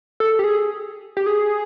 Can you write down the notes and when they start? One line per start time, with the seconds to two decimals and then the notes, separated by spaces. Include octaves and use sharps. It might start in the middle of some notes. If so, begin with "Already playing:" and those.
0.20 A4
0.39 G4
0.44 G#4
1.17 G4
1.26 G#4